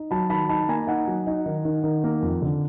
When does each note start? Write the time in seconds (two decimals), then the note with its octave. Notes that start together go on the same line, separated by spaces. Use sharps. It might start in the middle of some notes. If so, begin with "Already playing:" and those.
Already playing: D#4
0.11 F#3 A5 B5
0.30 D#3 A5 B5
0.49 D#4 A5 B5
0.68 A#3 G#5 A#5
0.87 D#4 F#5 G#5
1.07 F#3
1.27 D#4
1.46 D#3
1.65 D#3
1.84 D#3
2.04 A#3
2.22 F2
2.42 D3